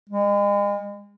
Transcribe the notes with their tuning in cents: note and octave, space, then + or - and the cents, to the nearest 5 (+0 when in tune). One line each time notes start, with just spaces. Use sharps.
G#3 -40